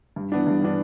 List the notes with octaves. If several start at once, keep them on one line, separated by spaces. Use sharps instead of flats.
G2
E3 B3 D4
G2
E3 B3 D4